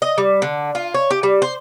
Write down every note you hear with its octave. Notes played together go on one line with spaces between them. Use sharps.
D#5
G3
D3
F4
C#5
G4
G3
C5